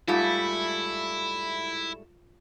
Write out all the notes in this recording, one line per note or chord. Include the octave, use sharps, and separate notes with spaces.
G#2 G3 A3 E4 F4